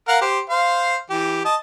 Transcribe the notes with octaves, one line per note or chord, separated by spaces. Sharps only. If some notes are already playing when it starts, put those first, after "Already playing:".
A#4 F5 F#5
G4 C5
C5 F5
E3 G4
D#5 A5